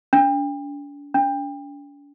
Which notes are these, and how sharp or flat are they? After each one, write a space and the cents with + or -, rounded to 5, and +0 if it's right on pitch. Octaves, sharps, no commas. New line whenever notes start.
D4 -40
D4 -45